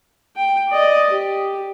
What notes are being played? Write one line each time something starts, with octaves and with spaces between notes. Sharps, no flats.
G5
D5 D#5
G4